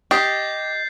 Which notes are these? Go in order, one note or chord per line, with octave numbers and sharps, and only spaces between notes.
G4 D#5 G6 A6 C7